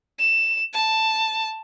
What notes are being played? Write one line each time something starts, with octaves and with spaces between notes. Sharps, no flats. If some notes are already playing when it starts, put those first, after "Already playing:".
E7
A5